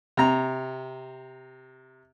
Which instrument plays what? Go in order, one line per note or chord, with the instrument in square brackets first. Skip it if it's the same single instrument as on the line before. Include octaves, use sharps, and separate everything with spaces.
[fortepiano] C3 A#5